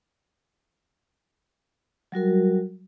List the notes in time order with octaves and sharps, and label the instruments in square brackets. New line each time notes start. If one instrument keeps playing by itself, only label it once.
[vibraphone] F#3 G3 F#4 A#4